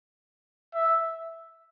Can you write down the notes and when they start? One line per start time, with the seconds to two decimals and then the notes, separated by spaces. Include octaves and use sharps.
0.74 E5